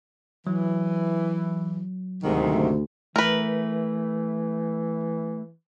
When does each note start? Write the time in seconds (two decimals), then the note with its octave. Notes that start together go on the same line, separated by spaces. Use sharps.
0.47 E3 F#3
2.23 D2 G#2 C3 D#3
3.16 E3 A3 A#4 B4